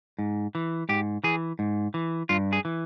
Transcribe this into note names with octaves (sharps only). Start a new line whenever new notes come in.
G#2
E3
G#2 G4
E3 G#4
G#2
E3
G2 F4
G#4
E3